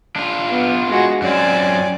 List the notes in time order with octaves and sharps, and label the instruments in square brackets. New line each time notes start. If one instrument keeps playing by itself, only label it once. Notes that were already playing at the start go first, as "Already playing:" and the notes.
[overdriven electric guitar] D4 F4
[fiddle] B3
G#3 F#4
[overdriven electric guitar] F#2 C4 [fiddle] D5 G#5